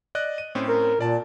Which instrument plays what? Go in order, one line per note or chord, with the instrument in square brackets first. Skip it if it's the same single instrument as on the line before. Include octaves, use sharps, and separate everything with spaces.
[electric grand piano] D5 D#5 F#6
D#7
A2 C4 C#4
[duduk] A#4
[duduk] A#2 [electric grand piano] D5 A5